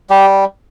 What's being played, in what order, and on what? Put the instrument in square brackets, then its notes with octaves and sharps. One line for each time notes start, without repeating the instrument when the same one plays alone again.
[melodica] G3 G4